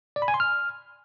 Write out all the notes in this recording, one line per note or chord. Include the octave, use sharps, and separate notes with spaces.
D5
B5
G#5
C6
F6